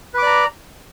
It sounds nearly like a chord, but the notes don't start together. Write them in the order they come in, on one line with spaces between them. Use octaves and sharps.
B4 D6 D5 A#5